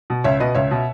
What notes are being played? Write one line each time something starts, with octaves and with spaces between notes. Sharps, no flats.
B2
C#2 C#5 E5
B2 B4 D#5
C#2 C#5 E5
B2